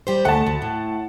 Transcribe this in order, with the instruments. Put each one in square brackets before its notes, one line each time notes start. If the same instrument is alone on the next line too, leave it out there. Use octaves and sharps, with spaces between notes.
[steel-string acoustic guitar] G3 G4 C5
[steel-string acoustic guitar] D2 A3 [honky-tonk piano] F#5 A5
[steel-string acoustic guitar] D2
A2